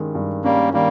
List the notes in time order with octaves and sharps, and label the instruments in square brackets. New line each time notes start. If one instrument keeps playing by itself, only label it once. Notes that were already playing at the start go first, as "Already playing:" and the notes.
Already playing: [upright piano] G2 D#3 G#3 C#4
G2
[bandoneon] G3 A#3 [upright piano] C#4
[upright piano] D#3 [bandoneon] G3 A#3